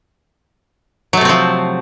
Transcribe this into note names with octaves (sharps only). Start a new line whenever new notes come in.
C3 F3 F#3 A3 C4